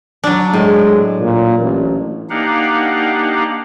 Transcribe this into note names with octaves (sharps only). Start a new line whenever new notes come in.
F#3 D4
A2 G#3
A#2
A1
A#3 D4 D#4 G4 F5 F#5